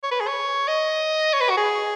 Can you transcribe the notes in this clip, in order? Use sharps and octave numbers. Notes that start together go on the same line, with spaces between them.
C#5
B4
G#4
C#5
D#5
C#5
B4
F#4
G#4